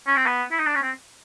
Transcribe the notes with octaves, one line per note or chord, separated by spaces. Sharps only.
C#4
C4
B3
E4
D#4
D4
C#4
C4